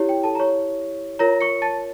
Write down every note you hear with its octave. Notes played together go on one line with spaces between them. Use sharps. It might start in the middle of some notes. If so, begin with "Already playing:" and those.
Already playing: E4 G4 C#5
G5
A4 A5
A#5
C#5 C#6
F4 A#4 C#5 A#5 A#6
C#6 C#7
A5 A6